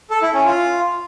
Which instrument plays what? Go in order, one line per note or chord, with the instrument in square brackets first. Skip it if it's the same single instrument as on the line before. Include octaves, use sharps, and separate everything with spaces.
[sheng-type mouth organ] A4
E4
C#4
F4